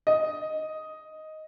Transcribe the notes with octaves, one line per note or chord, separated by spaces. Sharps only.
D#5